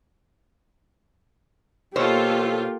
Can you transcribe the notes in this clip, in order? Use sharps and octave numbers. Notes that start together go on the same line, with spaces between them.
B2 A#3 F4 G4 A4 C5 C#5